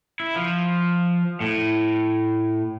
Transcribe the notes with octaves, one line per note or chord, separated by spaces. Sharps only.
E4
F3
A2